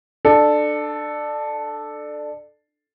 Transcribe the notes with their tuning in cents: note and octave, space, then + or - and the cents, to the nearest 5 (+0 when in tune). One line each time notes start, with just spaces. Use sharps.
D4 +25 A4 -5